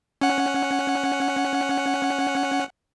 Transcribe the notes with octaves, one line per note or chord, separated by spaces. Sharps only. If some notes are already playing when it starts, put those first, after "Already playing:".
C#4 F#5